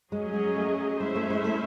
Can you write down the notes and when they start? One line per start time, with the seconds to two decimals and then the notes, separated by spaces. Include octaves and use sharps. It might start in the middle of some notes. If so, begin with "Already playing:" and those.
0.12 F#3 G#3 C#4 G#4 D#5
0.34 G#3
0.56 A3
1.00 G#3 C#4 E4 C5 E5
1.15 A3
1.30 G#3
1.44 A3